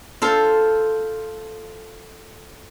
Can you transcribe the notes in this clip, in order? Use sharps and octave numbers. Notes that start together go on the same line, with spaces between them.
F4 A4 C5